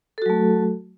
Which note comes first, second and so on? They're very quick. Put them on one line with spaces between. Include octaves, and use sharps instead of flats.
A4 F#4 F#3 A3